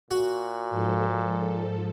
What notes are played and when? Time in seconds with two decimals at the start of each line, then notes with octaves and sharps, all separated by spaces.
0.11 A#2 F#4
0.69 G#2 F3 A4